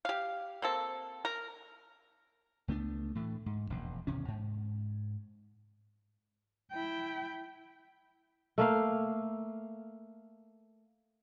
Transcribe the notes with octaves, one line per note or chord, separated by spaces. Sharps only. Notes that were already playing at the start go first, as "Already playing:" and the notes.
G4 F5
A#3 C4 A4
A#4
C#2 A3 B3 D4
A2 E3 A3
G#2
E1 A#1 F2
G#1 E2 C3 C#4
G#2
E4 G5
A3 A#3 F5